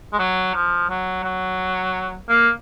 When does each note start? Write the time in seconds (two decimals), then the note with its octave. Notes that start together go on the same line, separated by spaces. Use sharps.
0.13 G#3
0.19 F#3
0.55 F3
0.90 F#3
1.24 F#3
2.29 A#3